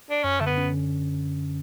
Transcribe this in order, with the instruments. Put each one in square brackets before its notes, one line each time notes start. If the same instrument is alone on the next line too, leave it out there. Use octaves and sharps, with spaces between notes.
[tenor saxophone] D4
[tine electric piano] F#2 [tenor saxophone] C#4
[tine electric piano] D3 [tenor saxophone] A3
[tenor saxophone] B3
[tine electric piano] C#4
D3